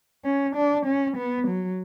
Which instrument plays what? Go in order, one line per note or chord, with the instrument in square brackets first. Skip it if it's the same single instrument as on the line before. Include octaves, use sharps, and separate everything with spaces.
[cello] C#4
D4
C#4
B3
F#3